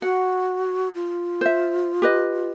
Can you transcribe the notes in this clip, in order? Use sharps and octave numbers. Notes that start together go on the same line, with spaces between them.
F#4 F#5
F4
C5 E5
G4 B4 D#5